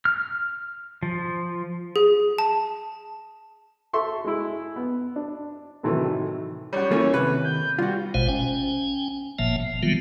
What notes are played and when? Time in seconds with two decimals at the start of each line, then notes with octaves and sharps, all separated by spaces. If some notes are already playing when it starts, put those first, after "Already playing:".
0.05 F6
1.03 F3
1.96 G#4
2.38 A5
3.93 A4 E5 C6 C#6
4.24 G#3 E4
4.76 B3
5.16 D4
5.83 A2 C3 D#3 E3 F#3 A3
6.73 F#2 G3 C#5
6.91 E3 A3 A#3 C#4
7.14 D#2 C3 B4
7.45 G6
7.79 G3 F4 F#4
8.14 G#1 B2 G#3 C5 F5
8.29 C#4 G5 G#5
9.39 F#1 A#2 F3 A#3 E5 A5
9.60 F3
9.83 D3 D#3 F#3 G3 B3 F4